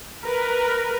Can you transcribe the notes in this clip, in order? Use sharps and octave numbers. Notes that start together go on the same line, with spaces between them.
A#4 B4